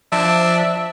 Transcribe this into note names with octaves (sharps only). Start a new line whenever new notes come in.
F3 D4 E5